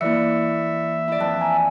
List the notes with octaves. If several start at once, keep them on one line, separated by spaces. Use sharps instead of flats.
E3 A#3 E4 D5 E5 C#7
E4 D5
F2 E3 A5
G#5 A#5